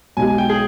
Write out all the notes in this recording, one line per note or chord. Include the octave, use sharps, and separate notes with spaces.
B1 B2 G#3 D#4 G4 G#5
G#5
G5
G#4